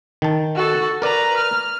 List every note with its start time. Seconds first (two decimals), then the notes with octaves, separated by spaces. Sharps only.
0.22 D#3 A5
0.55 F#4 A4
1.02 A#4 B4 D5 A#5
1.37 F6